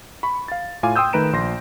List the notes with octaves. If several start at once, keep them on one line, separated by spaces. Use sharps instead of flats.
B5 C#6
F5 A6
A2 F4 F5 G#5 D6 D#7
G5 C6 D#6 E6 G6
D#3 A3 B4 A#5 D7 E7
A#1 C6 A#6